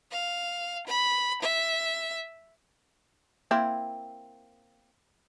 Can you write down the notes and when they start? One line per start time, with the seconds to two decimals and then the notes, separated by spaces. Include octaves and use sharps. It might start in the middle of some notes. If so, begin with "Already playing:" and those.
0.12 F5
0.87 B5
1.43 E5
3.51 A#3 C4 E4